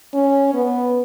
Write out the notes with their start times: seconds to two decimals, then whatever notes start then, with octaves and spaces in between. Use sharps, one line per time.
0.14 C#4
0.54 B3